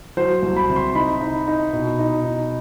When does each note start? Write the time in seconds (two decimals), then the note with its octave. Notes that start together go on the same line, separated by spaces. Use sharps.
0.17 F#3 C5
0.42 C2
0.56 B5
0.69 C3
0.76 C6
0.95 D#4 B5
1.21 D#4
1.47 D#4
1.73 B2
1.99 D#4
2.25 D#4